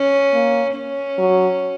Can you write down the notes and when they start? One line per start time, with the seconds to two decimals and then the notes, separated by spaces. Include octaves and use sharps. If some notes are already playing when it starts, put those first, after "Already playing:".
Already playing: C#4
0.33 A#3
0.76 C#4
1.18 F#3